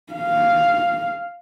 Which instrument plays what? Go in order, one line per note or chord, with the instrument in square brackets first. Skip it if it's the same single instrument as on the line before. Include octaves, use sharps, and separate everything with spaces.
[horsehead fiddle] F5